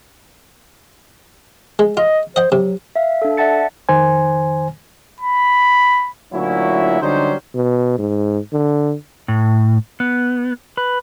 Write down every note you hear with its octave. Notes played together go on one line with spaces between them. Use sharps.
G#3
F4 D#5
C5 D#5 F#5
C3 F#3
E5 F5
D4 A4
D5 E5 F#5 A5 A6 C#7
F2 D#3 C5 G#5
B5
D2 A#2 F#3 C#4 E4
D3 F#3 G3 C#4 D#4 C5
B2
G#2
D3
A2
B3
B4